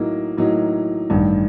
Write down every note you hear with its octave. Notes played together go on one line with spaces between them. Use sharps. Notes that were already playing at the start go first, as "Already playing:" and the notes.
Already playing: A2 F#3 A#3 D#4
A2 F#3 A#3 D#4
A1 G2 D#3